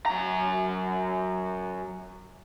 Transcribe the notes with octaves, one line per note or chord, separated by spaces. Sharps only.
F#2 A#5